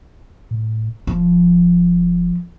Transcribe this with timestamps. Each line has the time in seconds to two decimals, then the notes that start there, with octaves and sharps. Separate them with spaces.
0.51 A2
1.07 E1 F3